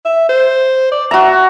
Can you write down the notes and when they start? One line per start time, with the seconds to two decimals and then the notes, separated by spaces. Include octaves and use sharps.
0.05 E5
0.29 C5
0.91 D5
1.11 F#4 E5 A#5